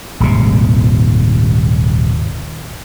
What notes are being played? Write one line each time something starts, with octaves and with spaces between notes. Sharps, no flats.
D#1 G#1 C3